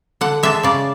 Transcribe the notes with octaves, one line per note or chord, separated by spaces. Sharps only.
D3 F#5
G#3 D4 E5
C#3 D5